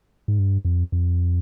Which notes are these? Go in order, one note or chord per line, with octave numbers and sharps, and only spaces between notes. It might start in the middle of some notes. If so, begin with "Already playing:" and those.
G#2
G2
F2
F2